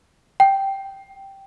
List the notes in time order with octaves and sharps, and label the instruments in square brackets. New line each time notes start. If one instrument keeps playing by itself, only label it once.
[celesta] G5